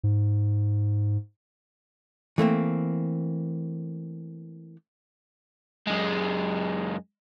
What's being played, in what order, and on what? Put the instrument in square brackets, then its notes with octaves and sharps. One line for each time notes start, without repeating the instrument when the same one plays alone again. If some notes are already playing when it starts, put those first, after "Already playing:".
[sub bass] G#2
[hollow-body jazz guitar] E3 A3 A#3 C4
[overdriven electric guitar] F#2 G#3